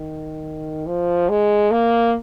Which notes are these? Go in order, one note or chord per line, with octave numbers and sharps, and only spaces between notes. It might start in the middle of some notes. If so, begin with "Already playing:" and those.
Already playing: D#3
F3
G#3
A#3